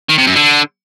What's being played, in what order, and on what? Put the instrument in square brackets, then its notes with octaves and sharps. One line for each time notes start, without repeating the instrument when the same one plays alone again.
[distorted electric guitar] D#3
C3
F#2
D3